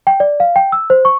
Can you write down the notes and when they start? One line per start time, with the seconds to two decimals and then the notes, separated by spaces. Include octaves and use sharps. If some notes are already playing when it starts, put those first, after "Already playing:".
0.07 G5
0.20 D5
0.40 F5
0.56 G5
0.72 E6
0.90 C5
1.05 C#6